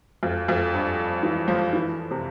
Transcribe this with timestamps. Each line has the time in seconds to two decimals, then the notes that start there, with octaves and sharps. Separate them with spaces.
0.23 F2
0.48 F2
0.74 G2
1.23 E3
1.48 F3
1.73 E3
2.11 C3